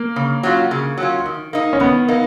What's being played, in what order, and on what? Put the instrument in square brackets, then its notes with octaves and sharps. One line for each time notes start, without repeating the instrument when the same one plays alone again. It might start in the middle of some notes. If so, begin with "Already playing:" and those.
Already playing: [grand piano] A#3
[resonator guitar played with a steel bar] C#3
F#3 C#4 F4
C#3
F#3 C#4 F4
D#3
A#3 D#4
[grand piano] C#4
[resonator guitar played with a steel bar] D#3 [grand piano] B3
[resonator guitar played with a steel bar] A#3 D#4